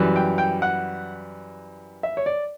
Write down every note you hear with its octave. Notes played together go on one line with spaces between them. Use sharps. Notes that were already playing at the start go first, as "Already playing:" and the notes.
Already playing: F#2 E3 G3
G5
G5
F#5
E5
C#5
D5